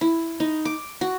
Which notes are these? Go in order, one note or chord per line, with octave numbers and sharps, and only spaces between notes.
E4
D#4
D6
F#4